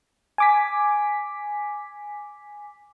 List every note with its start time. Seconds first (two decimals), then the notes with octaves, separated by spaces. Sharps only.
0.38 G#5 D6 B6